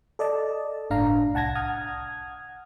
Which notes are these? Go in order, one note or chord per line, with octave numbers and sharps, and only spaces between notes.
A4 D5 D#5 A5
G1 A2 D4 F5 A#5
C2 F#5 A5 G#6 A#6
F#5 D#6 F6 G#6